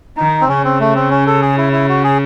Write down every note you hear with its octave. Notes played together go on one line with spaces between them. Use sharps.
D#3 D#4
C4
C#3 C#4
C4
A3
C4
C#4
A4
G#4
E4
E4
F#4
G#4